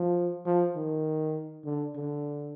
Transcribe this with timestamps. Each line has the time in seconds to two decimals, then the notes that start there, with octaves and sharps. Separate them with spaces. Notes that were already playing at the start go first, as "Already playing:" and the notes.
Already playing: F3
0.45 F3
0.75 D#3
1.65 D3
1.95 D3